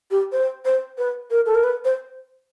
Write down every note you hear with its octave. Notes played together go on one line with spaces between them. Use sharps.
G4
C5
C5
B4
A#4
A4
A#4
B4
C5